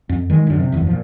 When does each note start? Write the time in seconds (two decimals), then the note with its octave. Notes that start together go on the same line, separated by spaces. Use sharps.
0.09 F2
0.30 D#3 G#3
0.47 F#2 D3
0.59 C3
0.72 F#1 E2
0.87 A#2 F3